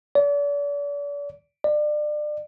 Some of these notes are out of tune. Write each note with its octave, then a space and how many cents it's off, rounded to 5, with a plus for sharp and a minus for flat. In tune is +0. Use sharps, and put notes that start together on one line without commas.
D5 -40
D5 +30